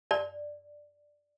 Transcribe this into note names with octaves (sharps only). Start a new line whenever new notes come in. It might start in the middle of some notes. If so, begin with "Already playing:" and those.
D5